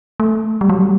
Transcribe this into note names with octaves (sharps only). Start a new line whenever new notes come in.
A3
G3
F#3
G3